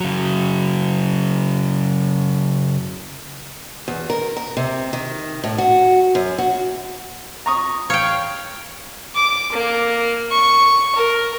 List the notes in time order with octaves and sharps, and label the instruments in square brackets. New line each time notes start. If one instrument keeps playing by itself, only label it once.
[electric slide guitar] C#3 F#3
[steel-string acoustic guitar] E2
A#4
A#4
C3
D#3
A2
F#4
F#2
F#4
[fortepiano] A#5 C#6 D#6
[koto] C#5 G5 [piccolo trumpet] F5
[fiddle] D6
A#3
C#6
A#4